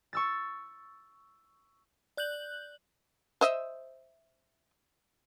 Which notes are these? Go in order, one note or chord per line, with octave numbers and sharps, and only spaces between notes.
C#6 E6 A6
D5 F#6 G6 F#7
C5 D#5 E5